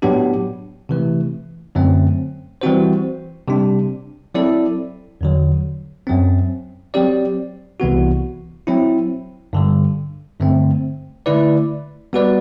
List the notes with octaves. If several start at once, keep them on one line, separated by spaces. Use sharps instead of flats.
A2 F#3 B3 D4 G4
C3 E3 A3
F#2 D3 F#3 A3 C4
E3 G3 C4 F#4 C5
C3 G3 D4
F#3 C4 E4 A4 D5
E2 D3 F#3
F#2 F#3 C4
F#3 C4 G4 D5
C2 C3 E3 B3 F#4
F#3 C4 E4
G2 D3 G3
G2 D3 A3 C4
D3 A3 E4 B4 D5
G3 B3 F#4 B4 D5